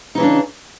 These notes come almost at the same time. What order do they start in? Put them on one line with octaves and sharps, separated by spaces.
D#4 E3 C#3 D4